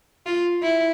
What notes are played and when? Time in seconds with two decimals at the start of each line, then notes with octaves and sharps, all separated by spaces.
0.26 F4
0.63 E4